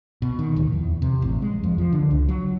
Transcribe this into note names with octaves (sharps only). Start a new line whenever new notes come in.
B2
D#3
D1
E2
C3
A1
G#3
F2
F3
D3
C#2
F#3